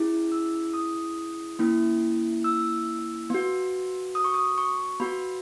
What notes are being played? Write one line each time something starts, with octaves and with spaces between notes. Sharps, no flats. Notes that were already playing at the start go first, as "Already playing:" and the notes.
Already playing: C#4 E4 G#4
E6
D#6
A#3 C#4 E4
E6
B3 F#4
D#6
C#6
D#6
C#6
B3 F#4 B5